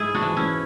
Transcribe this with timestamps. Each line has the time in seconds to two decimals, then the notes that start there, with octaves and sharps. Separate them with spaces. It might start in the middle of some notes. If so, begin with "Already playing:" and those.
Already playing: G#2 E4 G#4
0.15 D4 F#4
0.22 E3
0.37 C#4 E4